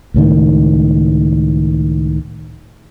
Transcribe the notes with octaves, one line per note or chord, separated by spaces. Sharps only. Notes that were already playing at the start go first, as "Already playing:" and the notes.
C#2 A2 D#3